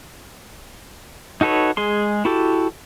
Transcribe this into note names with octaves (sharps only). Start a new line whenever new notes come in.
D#4 F#4 A4 B4 C#5
G#3 G#4 C6
E4 F#4 G4 A4